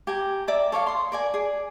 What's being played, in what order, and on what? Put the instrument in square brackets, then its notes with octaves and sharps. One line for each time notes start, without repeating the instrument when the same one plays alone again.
[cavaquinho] G4 G#5 A#5
D5 E5 A#5 D6
A4 C#5 D5 F5
C6 D#6
A#4 D5 G#5
G#4 D5